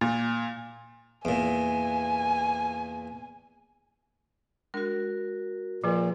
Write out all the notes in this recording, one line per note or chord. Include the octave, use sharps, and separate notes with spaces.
A#2
E2 A#2 G#5
G#3 D4 F#4 A#4
A#2 F3 G#4 B4